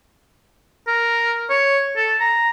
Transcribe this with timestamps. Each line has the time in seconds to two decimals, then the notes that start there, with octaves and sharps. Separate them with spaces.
0.87 A#4
1.50 C#5
1.96 A4
2.20 A#5